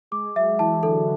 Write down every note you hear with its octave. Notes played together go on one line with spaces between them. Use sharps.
G#3 G#4 D6
F#3 F#4 E5
E3 E4 A5
D3 D4 A4